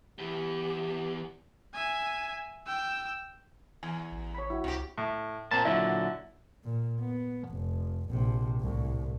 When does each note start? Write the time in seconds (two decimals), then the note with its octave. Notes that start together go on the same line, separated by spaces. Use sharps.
0.19 E2 E3 G4
1.74 E5 G#5
2.67 G5 E6
3.83 E2 G#5
4.12 A1
4.35 C#5 B5
4.50 E4 F#4
4.64 C2 C3 G4
4.98 A2
5.51 A#2 C4 A5
5.65 A#2 D3 F#3 E4
6.64 A#2
7.00 B3
7.49 F1
8.09 A#1 C3
8.60 C2 A2